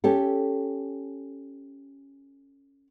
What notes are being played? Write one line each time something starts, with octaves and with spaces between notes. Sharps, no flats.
C#4 G4 A4